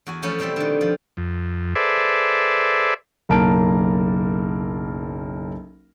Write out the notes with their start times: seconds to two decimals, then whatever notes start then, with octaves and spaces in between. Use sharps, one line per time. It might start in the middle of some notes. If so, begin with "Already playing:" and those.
0.07 E2 F#4 G#5
0.22 E3 F3 A3 B3 C#4 E4
0.39 B2 G3 C4 A4 E5
0.56 D3 D#3
0.81 F3
1.17 F2
1.75 G#4 A4 B4 C5 D5 E5
3.29 F#1 B1 A#3 A#4 A5 D7